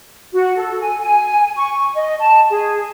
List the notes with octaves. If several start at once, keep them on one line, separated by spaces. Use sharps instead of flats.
F#4
A4
G#5
G#5
C#6
D#5
A5
G#4